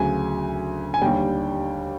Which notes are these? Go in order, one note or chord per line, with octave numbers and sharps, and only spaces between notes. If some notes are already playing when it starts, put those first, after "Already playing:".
Already playing: D2 C#3 F#3 G#5
G#5
D#2 D3 G3 G5